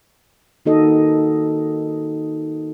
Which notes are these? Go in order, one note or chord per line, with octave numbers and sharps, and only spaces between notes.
D#3 A#3 D#4 F#4 A4 D#5